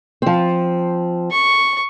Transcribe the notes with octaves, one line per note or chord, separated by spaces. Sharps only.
F3 C4
C#6